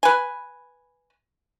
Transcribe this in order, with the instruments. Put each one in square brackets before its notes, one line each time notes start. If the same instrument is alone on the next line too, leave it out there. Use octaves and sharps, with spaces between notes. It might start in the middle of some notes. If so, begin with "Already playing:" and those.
[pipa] B4 G#5